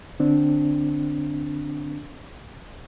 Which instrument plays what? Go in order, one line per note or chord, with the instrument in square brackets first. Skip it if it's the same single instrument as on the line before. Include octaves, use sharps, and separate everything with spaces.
[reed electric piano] D3 C4 D4